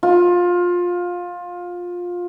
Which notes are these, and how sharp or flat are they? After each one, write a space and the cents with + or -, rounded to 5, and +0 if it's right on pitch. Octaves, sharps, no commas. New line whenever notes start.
F4 +20